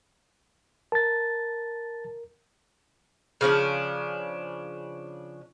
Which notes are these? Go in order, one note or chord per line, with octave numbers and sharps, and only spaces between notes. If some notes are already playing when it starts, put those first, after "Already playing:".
A#4 A5 A6
C#3 F3 C#4 D4